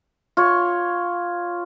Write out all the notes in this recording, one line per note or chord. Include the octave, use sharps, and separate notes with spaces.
F4 C#5